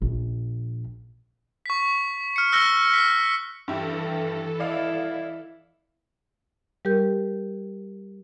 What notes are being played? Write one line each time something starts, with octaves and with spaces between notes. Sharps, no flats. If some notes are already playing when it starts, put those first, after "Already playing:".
A#1
C#6 B6
F6 C#7
E6 F#6 A#6 C#7 G7
B6
G2 E3 E4 G4 A4
E4 D5 D#5 F5
G3 G4 A#4 G6